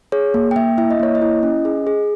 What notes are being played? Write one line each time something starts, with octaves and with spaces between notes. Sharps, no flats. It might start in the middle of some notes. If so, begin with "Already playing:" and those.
G#4 C#5
A#3
G5
A#3 E5
E4 E5
D#5
A#3 C#5
D#5
E4
C#4
G#4
G#4